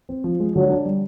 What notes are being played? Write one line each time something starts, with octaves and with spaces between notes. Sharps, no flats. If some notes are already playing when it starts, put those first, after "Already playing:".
C4
F3
G#3
D3 F#3
D4
G3